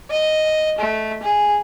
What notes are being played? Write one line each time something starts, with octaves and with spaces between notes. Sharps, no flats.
D#5
A3
G#4